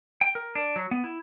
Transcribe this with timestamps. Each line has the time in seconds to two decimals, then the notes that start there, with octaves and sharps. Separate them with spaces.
0.21 G5
0.35 A#4
0.55 D4
0.76 F#3
0.91 B3
1.04 E4